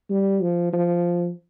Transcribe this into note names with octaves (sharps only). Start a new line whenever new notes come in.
G3
F3
F3